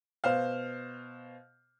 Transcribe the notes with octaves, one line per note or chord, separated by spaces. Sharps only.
B2 C5 F5